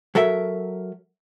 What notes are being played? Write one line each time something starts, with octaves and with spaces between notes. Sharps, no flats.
F#3 A4 A#4 E5